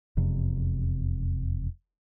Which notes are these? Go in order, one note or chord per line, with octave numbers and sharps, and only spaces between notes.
E1 F2 C3